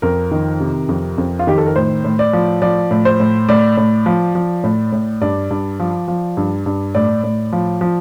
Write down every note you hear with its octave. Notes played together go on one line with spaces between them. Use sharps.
F2 A#4
D#3
C3
F2
F2
F4
D#3 G4
A4
A#4
A2 C5
A2
D5
F3
F3 D5
A2
C5
A2
A2 D5
A2
F3
F3
A2
A2
G2 D5
G2
F3
F3
G2
G2
A2 D5
A2
F3
F3